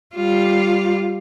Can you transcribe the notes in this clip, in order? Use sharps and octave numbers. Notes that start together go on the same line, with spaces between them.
G3 F4